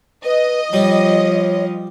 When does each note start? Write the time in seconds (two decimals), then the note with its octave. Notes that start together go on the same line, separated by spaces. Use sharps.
0.25 B4 D#5
0.73 F3 G3 C#5